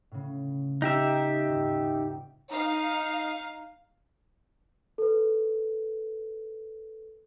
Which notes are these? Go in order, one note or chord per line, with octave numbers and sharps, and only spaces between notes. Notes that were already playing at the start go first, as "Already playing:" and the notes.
A2 C#3
D#4 G4 E5
D#1 G#1
D#4 F5
A4 B4